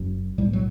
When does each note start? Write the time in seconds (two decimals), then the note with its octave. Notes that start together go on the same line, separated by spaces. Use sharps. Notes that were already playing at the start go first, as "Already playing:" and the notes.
Already playing: F#1 F#2
0.38 B1 A2 G3
0.53 F#3